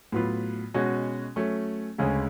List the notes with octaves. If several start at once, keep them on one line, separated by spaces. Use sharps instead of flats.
A2 F#3 B3 F4
B2 G#3 C#4 F#4
F#3 A3 C#4
D2 C#3 G#3 C#4